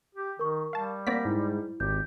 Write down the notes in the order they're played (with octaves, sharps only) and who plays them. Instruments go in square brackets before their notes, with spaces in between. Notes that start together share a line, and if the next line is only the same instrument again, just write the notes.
[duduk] G4
[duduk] D#3 [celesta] A#4 C#6
[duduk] G3 [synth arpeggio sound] F5 A5
[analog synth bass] A#3 [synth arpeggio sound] C4 D5 B6 [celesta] F#5 A#6
[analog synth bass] G#2 [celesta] E4
[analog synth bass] G#1 [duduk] G4 [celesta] G6